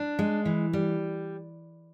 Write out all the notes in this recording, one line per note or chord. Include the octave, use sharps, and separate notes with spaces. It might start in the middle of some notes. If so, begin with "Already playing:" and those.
Already playing: D4
G#3
E3
G3